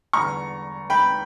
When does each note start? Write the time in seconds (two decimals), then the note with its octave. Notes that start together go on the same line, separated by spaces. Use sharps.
0.13 E2 D3 G3 A#5 C#6
0.90 G5 B5